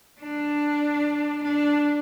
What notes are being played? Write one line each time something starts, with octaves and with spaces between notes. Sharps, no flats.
D4
D4